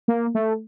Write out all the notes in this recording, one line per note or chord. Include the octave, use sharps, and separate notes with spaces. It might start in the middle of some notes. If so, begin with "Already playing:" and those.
A#3
A3